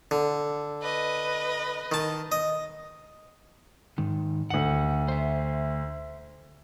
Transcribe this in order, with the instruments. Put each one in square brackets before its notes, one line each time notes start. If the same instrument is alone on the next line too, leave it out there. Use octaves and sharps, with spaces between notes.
[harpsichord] D3
[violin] B4 D#5
[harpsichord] D#3 A5
D#5
[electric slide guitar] G#2 D#3
[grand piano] D2 F#7 [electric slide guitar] F#5
[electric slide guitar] C5 E5